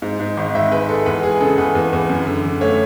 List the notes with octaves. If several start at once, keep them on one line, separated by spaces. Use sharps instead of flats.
G#2
G#2
G#1
G#1 E5
G#3 B4
G#3 A4
E2 B4
G#3 G#4
C#3 A4
E2 B4
E2
E2
F#2
D3
D3
A3 C#5